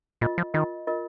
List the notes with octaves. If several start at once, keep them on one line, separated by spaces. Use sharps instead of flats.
A#2 F4 A#4 D#5
F3
D#3 F4 A#4 D#5
F4 A#4 D#5